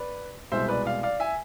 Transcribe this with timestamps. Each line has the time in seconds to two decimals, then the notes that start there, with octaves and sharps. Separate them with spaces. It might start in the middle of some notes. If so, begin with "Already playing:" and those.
Already playing: B4 D5
0.52 C2 B2 G#3 C5 E5
0.68 B4 D5
0.85 D5 F5
1.03 D5 F5
1.20 E5 G#5